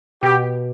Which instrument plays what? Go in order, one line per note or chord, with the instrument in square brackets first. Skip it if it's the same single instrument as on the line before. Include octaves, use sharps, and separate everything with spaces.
[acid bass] B2 [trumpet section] G4